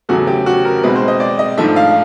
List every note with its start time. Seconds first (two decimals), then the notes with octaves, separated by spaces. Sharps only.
0.09 E2 C#3 F#3 A3 F#4
0.27 G4
0.46 F#4
0.65 A#4
0.83 B2 G#3 C4 D#4 B4
0.95 C5
1.08 D#5
1.20 D5
1.39 D#5
1.57 G#2 F3 A3 D4 E5
1.76 F5